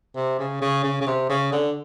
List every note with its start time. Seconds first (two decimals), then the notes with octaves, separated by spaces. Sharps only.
0.16 C3
0.39 C#3
0.62 C#3
0.84 C#3
1.01 C#3
1.07 C3
1.30 C#3
1.52 D3